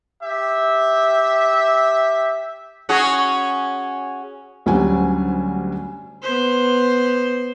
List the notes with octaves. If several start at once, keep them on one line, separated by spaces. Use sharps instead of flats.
G4 E5
C#4 F#4 G#4
D2 F#3 G3 C#4 G#5
B3 C5